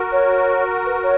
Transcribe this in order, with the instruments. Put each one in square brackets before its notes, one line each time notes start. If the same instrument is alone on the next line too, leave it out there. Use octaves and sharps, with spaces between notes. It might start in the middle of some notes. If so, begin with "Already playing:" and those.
Already playing: [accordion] F#4 A#4
[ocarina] C#5
B4
C#5